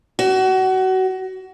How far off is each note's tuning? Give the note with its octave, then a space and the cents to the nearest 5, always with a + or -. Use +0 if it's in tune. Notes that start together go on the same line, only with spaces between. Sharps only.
F#4 +25